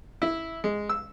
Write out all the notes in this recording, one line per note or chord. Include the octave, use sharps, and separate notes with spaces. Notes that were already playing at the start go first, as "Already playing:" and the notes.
E4
G#3
E6